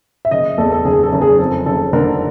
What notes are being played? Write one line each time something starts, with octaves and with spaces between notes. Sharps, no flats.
E5
F#1 D#5
E2 A4
A4
F#1 G#4
A4
F#1
G#4
F2 A4
F#1 A4
D3 A#4